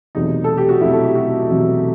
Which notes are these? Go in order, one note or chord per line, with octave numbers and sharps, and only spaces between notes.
E1 E2 C3 F#3 A3 D#4
A4
G4
F#4
E1 E2 C3 F#3 A3 E4
A4
G4
F#4
E1 E2 C3 F#3 A3